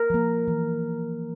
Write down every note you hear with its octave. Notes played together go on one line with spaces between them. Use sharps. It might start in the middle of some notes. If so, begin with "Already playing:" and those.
Already playing: A#4
F3 A#3
E3